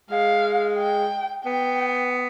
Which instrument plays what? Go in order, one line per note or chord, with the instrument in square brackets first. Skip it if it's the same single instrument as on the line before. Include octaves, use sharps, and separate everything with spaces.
[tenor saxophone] G#3 [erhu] F5
[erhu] G5
[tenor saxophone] B3 [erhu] G5